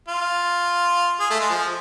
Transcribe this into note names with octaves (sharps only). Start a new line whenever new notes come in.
F4
G#4
A3
G#3
F3